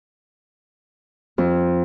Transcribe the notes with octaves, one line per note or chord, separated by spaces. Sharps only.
F2